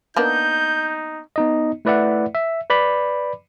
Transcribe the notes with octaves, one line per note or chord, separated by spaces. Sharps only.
A#3 B3 D4 D#4 G6
B3 D#4 D#5
A3 E4 B4 D5 E5 F#5
E5
B4 D5 B5 D6